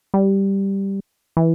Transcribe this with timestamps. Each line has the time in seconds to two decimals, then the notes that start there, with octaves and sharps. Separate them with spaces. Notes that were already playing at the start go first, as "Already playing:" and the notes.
0.14 G3
1.37 E3